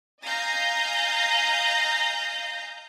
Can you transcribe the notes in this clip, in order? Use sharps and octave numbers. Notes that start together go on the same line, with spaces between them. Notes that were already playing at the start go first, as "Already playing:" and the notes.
D#5 F5 G#5 A#5 G6 A#6